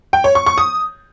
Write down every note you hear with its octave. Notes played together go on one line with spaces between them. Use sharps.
G5
C#5
C#6
C#6
D#6